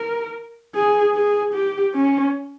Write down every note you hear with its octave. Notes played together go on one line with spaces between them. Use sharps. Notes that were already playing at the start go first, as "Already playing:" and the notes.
Already playing: A#4
G#4
G#4
G4
C#4